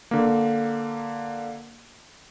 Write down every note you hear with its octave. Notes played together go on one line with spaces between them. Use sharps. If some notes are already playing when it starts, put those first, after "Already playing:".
D3 A#3